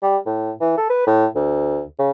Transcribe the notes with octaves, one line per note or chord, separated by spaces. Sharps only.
G3
A2
E3
A4
B4
A2
D2
C#3